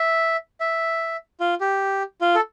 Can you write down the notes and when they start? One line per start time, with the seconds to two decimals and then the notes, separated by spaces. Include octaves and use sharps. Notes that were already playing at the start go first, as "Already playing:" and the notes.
Already playing: E5
0.60 E5
1.40 F4
1.61 G4
2.21 F4
2.35 A4